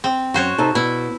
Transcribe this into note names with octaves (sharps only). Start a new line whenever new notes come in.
C4
F#2 F#4 C5 C#5
C3 D#4 A4
B2 E4